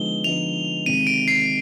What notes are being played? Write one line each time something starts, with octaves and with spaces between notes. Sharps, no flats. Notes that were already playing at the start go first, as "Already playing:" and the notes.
Already playing: D3 F3 G#3 B3 D#4 G7
D3 F3 G#3 B3 D#4 F7
C3 D#3 G#3 D#7
D7
C7